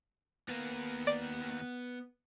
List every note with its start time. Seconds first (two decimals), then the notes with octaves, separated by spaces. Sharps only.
0.49 D#2 A#3 B3
1.07 D5